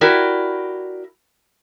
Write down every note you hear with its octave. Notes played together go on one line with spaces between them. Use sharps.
E4 F#4 G4 A#4 D5